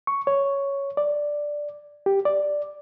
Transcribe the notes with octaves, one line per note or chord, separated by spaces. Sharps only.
C#6
C#5
D5
G4
D5